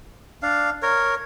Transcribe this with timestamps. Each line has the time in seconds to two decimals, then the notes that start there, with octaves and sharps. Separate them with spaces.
0.42 D4 F5
0.82 A#4 C#5